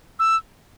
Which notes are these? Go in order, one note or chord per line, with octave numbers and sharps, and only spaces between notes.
E6